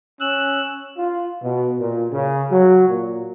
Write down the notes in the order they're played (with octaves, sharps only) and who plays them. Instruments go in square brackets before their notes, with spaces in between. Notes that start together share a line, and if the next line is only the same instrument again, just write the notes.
[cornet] C#4 [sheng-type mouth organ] E6 F#6
[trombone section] F4
B2
A#2
C#3
F#3
A#2